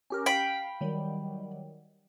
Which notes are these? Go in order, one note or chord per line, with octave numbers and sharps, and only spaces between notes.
C#4 G4 A#4
F5 G5 B5
D#3 F#3 G3